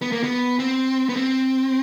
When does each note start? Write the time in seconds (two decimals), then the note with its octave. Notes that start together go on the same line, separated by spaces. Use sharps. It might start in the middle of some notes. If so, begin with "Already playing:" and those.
0.02 B3
0.12 A#3
0.23 B3
0.59 C4
1.09 B3
1.16 C4